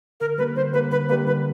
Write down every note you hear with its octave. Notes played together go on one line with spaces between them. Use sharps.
D3 A#4
G3 A#3 B4
D3 C5
G3 A#3 B4
D3 B4
G3 A#3 B4
D3 B4